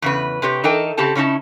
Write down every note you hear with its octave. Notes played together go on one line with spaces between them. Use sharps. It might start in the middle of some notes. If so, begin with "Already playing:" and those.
E2 C#3 B4
C3 G4 B4 C#5
E3 D#4 A4 A#4 D#5 G5
C#3 C4 G4 A4 A5
C#3 C#4 D#4 E4 A5